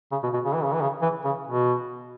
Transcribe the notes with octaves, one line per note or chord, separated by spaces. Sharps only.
C#3
B2
B2
C#3
E3
C#3
E3
C#3
E3
C#3
B2